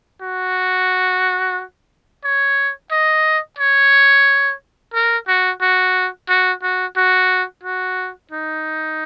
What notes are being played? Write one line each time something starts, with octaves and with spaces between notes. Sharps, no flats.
F#4
C#5
D#5
C#5
A#4
F#4
F#4
F#4
F#4
F#4
F#4
D#4